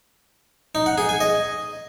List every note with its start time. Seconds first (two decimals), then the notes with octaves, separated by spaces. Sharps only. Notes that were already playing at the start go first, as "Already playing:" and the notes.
0.75 D#4
0.86 F#5
0.98 G#4
1.09 G#5
1.20 D#5